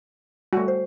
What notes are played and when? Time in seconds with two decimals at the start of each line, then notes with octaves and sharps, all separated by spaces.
0.53 G3 A3 F#4
0.68 C5